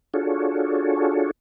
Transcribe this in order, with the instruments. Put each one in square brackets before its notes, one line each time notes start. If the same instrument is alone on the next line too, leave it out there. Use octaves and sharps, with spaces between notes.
[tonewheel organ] D4 F4 F#4 G#4 A4 C#5